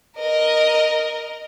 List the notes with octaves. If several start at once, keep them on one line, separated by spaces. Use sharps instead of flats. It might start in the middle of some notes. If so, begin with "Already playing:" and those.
A#4 D#5